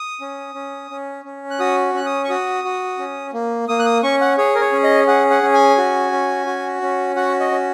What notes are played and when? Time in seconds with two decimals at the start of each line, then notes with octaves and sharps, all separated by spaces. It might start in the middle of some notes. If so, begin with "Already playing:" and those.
Already playing: D#6
0.21 C#4
0.55 C#4
0.91 C#4
1.25 C#4
1.50 F#6
1.60 F#4 D#6
1.94 C#4 F#6
2.06 D#6
2.24 C#6
2.29 F#4 D#6
2.64 F#4
2.99 C#4
3.33 A#3
3.68 A#3 D#6
3.79 F#6
3.86 D#6
4.03 C#4 C#6
4.21 F#5
4.38 G#4 C#5
4.55 A#4
4.61 C#5
4.73 C#4
4.84 D#5
5.07 G#4 F#5
5.30 F#5
5.43 C#4
5.54 G#5
5.78 F#4
6.12 C#4
6.46 F#4
6.82 C#4
7.16 F#4 F#5
7.40 D#5
7.51 C#4